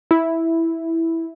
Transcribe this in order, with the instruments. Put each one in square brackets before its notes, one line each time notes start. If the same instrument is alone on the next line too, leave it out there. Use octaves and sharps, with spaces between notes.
[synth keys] E4